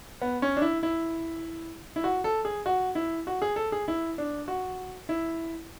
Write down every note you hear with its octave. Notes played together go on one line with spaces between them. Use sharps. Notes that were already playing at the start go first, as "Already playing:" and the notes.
B3
C#4
D4
E4
E4
E4
F#4
A4
G#4
F#4
E4
F#4
G#4
A4
G#4
E4
D4
F#4
E4